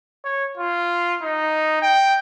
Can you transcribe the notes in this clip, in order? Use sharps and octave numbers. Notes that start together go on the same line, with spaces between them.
C#5
F4
D#4
G5